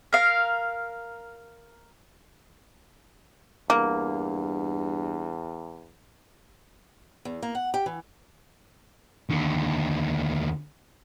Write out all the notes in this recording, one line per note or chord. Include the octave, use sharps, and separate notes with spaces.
A#4 F5
E2 G2 A#3
E2
A#3
F#5
G4
E3
D#2 D3